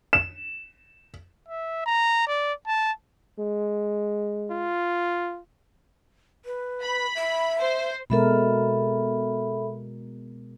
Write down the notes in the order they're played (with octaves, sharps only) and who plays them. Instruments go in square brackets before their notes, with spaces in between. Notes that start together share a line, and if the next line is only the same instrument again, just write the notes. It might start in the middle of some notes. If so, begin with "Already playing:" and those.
[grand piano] E7
[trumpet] E5
A#5
D5
A5
[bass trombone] G#3
[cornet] F4
[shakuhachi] B4
[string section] B5
[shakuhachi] E5
[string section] C5
[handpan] B2 G#3 A#4 [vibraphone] A4 E5 B5